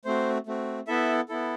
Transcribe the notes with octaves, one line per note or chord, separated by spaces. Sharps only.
A3 C4 F#4 C5
A3 C4 F#4
B3 E4 A4 E5
B3 E4 A4